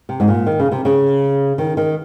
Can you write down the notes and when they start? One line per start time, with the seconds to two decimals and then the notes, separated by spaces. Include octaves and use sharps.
0.09 C3
0.20 G#2
0.28 A#2
0.46 D#3
0.59 C#3
0.72 C3
0.85 C#3
1.58 D#3
1.77 D#3